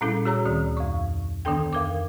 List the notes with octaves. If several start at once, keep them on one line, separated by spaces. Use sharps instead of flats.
A#2 G3 C#4 E4 A4
F#4 G#4 C#5 A#5 E6
D2 D#3
F2 C#6
D3 D#3 B3 D4 A4 G5
F2 A#4 D6